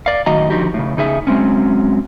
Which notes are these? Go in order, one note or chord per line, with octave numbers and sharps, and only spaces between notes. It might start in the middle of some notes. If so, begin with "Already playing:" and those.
D5 F5
F#2 A2 D#3 F#4 D#5 A#5
D3 F3 D#4 F#4 G4
A2 C#3
C#3 D#4 G#4 E5
F#3 G#3 C4 C#4